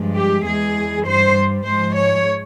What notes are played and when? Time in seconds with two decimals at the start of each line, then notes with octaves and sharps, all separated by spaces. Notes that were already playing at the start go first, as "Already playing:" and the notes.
Already playing: G2 F3 G#3
0.16 G4
0.45 E2 E3 G#3 G#4
1.05 G2 G3 C5
1.64 G#2 F3 G#3 C5
1.95 C#5